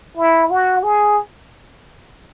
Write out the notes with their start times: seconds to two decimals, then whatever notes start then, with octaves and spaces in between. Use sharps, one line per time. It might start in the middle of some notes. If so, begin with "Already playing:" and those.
0.17 E4
0.50 F#4
0.83 G#4